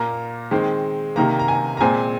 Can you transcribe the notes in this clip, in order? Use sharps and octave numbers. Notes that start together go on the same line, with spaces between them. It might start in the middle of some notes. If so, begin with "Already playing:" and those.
Already playing: A#2 A#3 A#5
D#3 G#3 C4
C3 D#3 A#3 A#5
A#5
G#5
A#5
A#2 G#3 C4 G#5